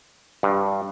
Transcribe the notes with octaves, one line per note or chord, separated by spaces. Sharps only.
G2